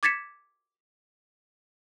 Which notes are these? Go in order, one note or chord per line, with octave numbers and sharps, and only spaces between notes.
D6 G#6 A6 B6 C#7 E7